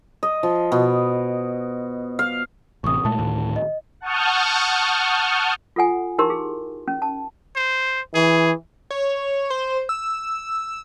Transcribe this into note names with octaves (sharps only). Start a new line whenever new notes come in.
D#5
F3
B2
F5
A1 C3 C#6 D#6
A#2 G#3 A3 A5
D2 A2 D#3
D#5
F#5 A5 C#6 D#6 F6 G6
F4 A4 F#5 G#5
D#4 E4 G4 A#4 C6
G#4
C#4
A5
C5
E3 G#4
C#5
C5
E6